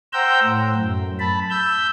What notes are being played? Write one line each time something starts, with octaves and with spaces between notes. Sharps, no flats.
C5 F#5 G5 A#5 E6 G6
A2
F#2
A5 B5
E6 G6